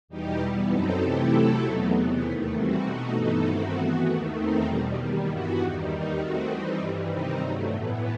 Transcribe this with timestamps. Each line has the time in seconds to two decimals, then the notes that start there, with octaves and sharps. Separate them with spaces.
0.08 E2 B2 G3 D#4 G4
0.39 E3 G3 B3
0.69 F#2 F#3 C4 D#4 A4
1.00 C3 E3 A3 E4 G4
1.30 C3 F#3 A3 E4 A4
1.61 E2 B2 F#3 A3 D#4
1.91 E2 C3 E3 B3
2.22 D#2 D#3 A3
2.52 E3 G3 C4 F#4
2.83 B2 A3 D#4 F#4
3.13 G2 E3 B3 D#4 A4
3.44 G2 D#3 A3 C4 F#4
3.73 E3 B3 F#4
4.04 D#2 D#3 A3
4.35 E2 D#3 A3 C4 D#4
4.65 E2 B2 G3
4.95 D#2 D#3 G3
5.25 G2 E3 B3 F#4
5.57 E2 D#3 G3
5.87 D#2 D#3 G3 D#4
6.17 D#3 A3 C4 F#4
6.47 E3 G3 C4 D#4
6.78 G2 E3 G3
7.08 C3 D#3 G3 C4 D#4
7.39 G2 F#3 A3
7.69 A2 E3 B3